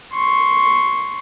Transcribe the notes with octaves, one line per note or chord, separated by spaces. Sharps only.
C6 C#6